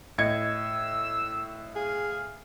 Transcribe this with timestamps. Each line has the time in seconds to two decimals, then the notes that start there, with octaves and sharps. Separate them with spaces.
0.18 A2 D#5 E6 G#6 C#7
1.75 G#4 F5